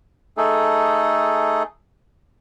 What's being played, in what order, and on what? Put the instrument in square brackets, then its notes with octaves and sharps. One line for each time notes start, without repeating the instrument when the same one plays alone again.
[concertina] A3 D#4 G#4 A4